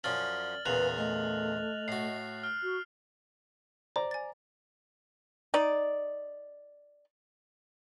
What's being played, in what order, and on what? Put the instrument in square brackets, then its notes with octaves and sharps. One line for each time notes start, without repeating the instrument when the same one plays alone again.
[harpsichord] F#2 F3 C#4 [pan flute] D5 [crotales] F6 A6 F#7
[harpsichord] E2 A#2 C#3 [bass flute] B4 [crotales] F#6 F7 F#7
[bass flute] A3 [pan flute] D#5
[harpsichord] A2 F#4 [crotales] C7
[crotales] F6
[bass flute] F#4
[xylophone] C5 [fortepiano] D5 A#5
[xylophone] G#5 A6
[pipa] D#4 D5